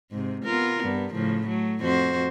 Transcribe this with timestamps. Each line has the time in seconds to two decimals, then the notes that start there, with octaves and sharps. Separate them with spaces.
0.11 G#2 C3
0.44 B3 F4 A#4
0.82 G2 B3
1.14 A2 C#3 F3
1.47 F#3 A3
1.81 F2 F#4 C5